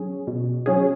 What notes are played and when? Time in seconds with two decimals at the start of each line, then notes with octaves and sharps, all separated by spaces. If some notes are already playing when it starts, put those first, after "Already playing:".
Already playing: F#3 C#4 G#4
0.27 B2
0.66 F#3 C#4 G#4